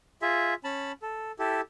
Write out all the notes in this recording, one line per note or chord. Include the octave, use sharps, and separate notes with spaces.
F4 G#4 E5
C#4 A5 B5
A4
E4 G4 A4